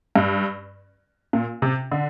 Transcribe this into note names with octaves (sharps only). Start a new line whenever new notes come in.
G2
A#2
C3
D3